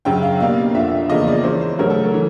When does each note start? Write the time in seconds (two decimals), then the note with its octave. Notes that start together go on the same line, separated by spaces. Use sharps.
0.05 F#2 C#3 F#3 G5
0.23 F5
0.40 B2 G3 A#3 D4 F5
0.74 F2 D3 F3 E5
1.09 E2 C#3 F3 A#3 D#5
1.27 D5
1.43 E3 G#3 C#4 C5
1.61 C5
1.79 C#3 F#3 A3 C#4 A#4
1.90 A4
2.14 E3